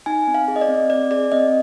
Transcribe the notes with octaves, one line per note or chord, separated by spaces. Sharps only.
D#4 G#5
C4
F5
G#4
D#5
D5
C4
C4 D5
G#4 D5
C4 D#5